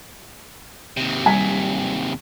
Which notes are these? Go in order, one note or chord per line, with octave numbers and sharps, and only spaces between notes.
D#2 C3
G3 G#5 B6